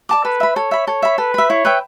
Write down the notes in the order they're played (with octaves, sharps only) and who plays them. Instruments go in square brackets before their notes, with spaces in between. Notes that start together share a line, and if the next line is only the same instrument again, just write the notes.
[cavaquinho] D5 A5 D6
[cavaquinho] A4 [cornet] B4
[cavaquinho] E5 B5
[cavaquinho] A4 [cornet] C#5
[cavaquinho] E5 B5
[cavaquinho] A4 [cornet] C#5
[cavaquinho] E5 B5
[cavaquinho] A4 [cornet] B4
[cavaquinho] E5 B5
[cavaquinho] E4 [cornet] C#5
[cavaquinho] B4 E5 G5